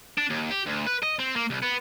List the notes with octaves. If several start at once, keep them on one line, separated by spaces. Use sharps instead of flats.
D4
D#2
G4
D2
B4
D#5
C4
A#3
C2
B3